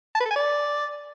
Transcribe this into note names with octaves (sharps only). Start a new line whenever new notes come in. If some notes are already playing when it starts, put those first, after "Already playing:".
A5
B4
A4
G#5
D5